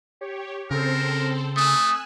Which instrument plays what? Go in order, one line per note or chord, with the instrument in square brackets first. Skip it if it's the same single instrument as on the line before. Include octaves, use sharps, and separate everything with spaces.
[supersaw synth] G4 C#5
[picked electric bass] C#3 [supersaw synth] C4 A4 C5 [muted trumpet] A#4
[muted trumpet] A3 [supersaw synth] G#5 E6 F#6 [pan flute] D#6